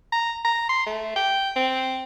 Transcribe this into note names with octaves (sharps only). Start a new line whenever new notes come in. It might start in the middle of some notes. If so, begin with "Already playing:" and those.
A#5
A#5
C6
A3
G5
C4